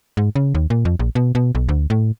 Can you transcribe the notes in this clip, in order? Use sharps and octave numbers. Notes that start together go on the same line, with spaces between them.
G#2
C#3
D#2
A#2
F2
A#1
B2
B2
B1
D2
A2